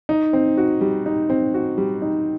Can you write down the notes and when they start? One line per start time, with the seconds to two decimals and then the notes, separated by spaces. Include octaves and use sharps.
0.09 D#4
0.33 C4
0.58 F#4
0.81 G3
1.06 D#4
1.30 C4
1.54 F#4
1.78 G3
2.02 D#4